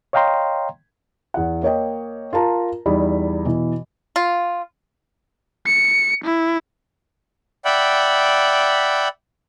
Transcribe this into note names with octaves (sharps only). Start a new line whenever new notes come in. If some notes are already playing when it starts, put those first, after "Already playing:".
C#5 D#5 F5 G5 A#5 C6
E2 F#5
A#3 C#5 D#5 G5
F4 A#4 A5 A#5
E2 G3 D#4 B5
B2 E3
F4
C#7
E4
D5 E5 F#5 G5 B5